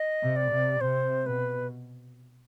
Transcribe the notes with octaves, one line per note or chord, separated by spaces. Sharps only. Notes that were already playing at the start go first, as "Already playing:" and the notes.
Already playing: D#5
C3
D5
C3
C3 C5
B2 B4